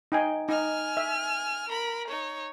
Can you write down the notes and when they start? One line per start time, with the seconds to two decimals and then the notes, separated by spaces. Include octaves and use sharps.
0.12 D#4 G5 G#5
0.49 D#4 G#5 F6
0.97 E5
1.69 A#4 B5
2.08 D#4 C#5